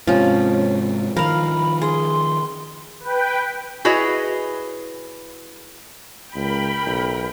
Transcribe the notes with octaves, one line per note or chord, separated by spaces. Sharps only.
G#2 C3 F3 C#4 C#5
D#3 F3 A#4 F5 B5
G#4 C6
B4 G5
E4 F#4 G#4 B4 C#5 D#5
C#2 A#4 G5 B5
B1